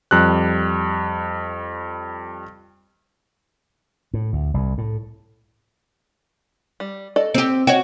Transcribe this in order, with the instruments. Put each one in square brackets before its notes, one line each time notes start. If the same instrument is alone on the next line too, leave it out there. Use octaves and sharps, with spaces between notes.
[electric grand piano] F2 G3 F#6
[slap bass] A2
D2
C2
A2
[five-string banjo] G3
A4 D5 D#5
[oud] C4 G4
[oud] F#4 [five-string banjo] C#5 D#5 G5